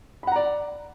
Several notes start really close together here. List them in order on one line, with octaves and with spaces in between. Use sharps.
B5 F#5 A#5 D5